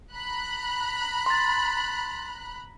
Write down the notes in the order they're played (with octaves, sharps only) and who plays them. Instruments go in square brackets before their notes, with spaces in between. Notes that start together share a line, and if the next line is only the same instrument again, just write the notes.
[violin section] A#5 B5 F#6
[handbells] C6 A6